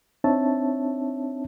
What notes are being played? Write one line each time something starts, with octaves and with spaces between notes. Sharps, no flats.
C4 D4 D#4 C#5 E5 A5